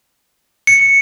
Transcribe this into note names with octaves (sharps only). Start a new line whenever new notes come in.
C#7